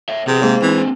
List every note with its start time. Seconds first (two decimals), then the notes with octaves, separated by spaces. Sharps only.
0.09 C#5 E5
0.27 C3 B3 G#4
0.42 G#2 A#3
0.62 E3 C4 D4